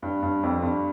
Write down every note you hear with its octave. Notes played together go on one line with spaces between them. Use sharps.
G2
G2
F2
G2